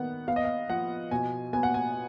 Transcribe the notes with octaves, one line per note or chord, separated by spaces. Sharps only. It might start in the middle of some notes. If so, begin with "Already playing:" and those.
Already playing: D#3 B3 F#5
B3 F5
D#5
F5
F3 F#5
B2 G#5
B3 G#5
F#5
G#5